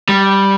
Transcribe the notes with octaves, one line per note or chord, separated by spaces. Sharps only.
G3